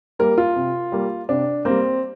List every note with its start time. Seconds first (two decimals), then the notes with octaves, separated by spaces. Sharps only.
0.19 G3 A#3 A#4
0.38 F4
0.56 C3
0.92 G3 A#3
1.29 C3 D4
1.65 G3 A#3 C4